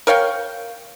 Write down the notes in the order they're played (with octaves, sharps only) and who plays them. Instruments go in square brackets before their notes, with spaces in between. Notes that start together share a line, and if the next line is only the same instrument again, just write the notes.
[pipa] A#4 C#5 F5 G5